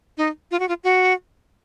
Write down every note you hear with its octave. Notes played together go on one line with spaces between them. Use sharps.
D#4
F4
F#4
F4
F#4